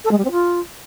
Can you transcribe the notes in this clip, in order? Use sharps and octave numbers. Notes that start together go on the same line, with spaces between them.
A4
G#3
G3
C4
F4